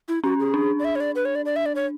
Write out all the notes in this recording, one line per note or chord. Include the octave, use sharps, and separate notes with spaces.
E4
C#4 F#4
G#4
D4
D5
E5
C#5
D5
B4
C#5
D5
D5
E5
D5
C#5